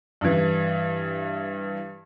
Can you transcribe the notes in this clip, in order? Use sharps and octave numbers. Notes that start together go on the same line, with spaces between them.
G2 E3